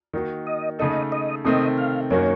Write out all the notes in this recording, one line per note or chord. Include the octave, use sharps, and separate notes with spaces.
D#3 A#3 D#4 F#4
D#5
C#3 A3 D#4 A4 D#5
D#5
C3 D#3 A3 C4 D#5
F5
F#2 D#3 A#3 C#4 F#4 C#5